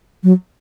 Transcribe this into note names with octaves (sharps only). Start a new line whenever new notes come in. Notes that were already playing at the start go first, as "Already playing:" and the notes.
F#3